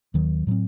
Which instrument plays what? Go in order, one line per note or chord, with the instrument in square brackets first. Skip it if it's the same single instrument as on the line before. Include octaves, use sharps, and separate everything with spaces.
[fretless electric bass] D#2 D#3 F#3
A2 F#3 C4